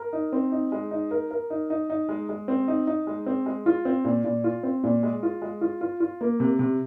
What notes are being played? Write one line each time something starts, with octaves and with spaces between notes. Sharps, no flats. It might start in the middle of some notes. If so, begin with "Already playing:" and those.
Already playing: A#4
D#4
C4
D#4
G#3
D#4
A#4
A#4
D#4
D#4
D#4
G#3
G#3
C4
D#4
D#4
G#3
C4
G#3
F4
C4
A#2
A#2
F4
C4
A#2
G#3
F4
G#3
F4
F4
F4
A#3
C3
C3